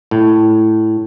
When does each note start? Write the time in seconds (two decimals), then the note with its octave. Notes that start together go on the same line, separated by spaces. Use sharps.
0.11 A2